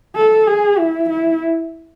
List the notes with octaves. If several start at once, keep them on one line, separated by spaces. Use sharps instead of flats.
A4
G#4
E4
E4